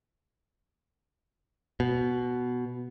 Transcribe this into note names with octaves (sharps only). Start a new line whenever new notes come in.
B2